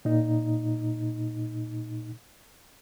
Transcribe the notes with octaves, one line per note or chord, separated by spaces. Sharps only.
A#2 D#4